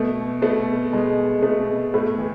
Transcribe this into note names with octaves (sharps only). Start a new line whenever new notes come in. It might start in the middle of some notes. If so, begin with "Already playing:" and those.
Already playing: B2 A3
B2 A3
B2 G#3
B2 A3
A2 A3
E3